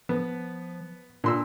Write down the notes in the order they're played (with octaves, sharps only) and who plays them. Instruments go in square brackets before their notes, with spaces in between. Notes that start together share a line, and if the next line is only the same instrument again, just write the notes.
[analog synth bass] F3 [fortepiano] B3
[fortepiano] A#2 C6 E6 [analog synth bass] D4